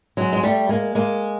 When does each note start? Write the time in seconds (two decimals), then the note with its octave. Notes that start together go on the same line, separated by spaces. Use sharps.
0.17 F#3 G#3
0.33 G#3
0.43 G3 A3
0.69 G#3 A#3
0.95 G#3 A#3